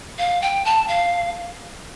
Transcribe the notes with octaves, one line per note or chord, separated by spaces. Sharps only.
F5
G5
A5
F5